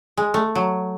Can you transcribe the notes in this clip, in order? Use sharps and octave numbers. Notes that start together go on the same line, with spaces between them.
G#3
A3
F#3